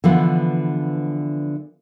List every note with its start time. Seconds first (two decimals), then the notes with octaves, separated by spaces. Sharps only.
0.04 D3 E3 F3 B3